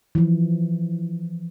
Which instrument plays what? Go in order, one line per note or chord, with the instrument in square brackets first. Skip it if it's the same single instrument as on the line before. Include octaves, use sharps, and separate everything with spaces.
[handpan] E3 F3